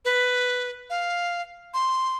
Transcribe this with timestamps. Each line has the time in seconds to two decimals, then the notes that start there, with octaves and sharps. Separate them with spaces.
0.05 B4
0.90 F5
1.74 C6